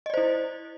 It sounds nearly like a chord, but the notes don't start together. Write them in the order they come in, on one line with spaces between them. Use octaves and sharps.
D#5 D5 C5 E4